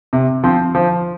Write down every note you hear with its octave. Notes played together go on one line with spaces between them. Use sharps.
C3
F3 C4
F3